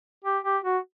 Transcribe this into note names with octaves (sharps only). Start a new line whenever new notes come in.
G4
G4
F#4